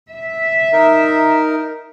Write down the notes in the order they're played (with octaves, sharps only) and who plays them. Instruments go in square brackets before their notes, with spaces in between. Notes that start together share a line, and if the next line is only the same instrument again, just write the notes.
[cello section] E5
[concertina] D#4 A#4